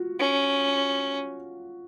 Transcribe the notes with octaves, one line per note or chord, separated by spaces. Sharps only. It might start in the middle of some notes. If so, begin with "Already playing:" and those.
Already playing: F4 F#4
C#4